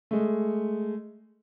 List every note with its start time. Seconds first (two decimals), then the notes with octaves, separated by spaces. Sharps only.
0.11 G#3 A3